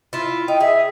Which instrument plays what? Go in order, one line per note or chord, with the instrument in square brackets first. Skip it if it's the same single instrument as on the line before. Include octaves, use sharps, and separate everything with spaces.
[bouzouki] E4 F4
[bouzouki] D#4 [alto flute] G5
[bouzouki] G#4 [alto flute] E5